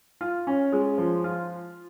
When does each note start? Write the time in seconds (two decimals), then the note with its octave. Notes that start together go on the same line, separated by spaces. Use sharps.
0.21 F4
0.47 C#4
0.72 G#3
0.98 F3
1.24 F4